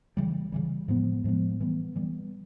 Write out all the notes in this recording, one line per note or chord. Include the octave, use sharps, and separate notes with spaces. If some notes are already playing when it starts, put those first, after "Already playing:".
C#3 E3 G3
C#3 E3 G3
A2 F3 G#3 B3
A2 F3 G#3 B3
E3 G3 B3
E3 G3 B3